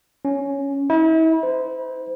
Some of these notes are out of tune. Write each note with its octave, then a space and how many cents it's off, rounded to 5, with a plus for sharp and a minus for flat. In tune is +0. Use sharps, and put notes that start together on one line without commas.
C#4 +5
E4 -40
C5 -30